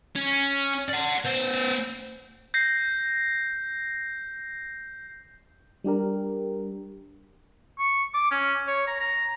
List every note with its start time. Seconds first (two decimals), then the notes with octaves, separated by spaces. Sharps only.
0.15 C#4
0.88 D5 F#5
1.25 B3 C5
2.54 G6 A#6 C7
5.84 G3 D4 G4 A#4
7.79 C#6
8.14 D6
8.31 C#4
8.67 C#5
8.87 A#5
9.00 A#5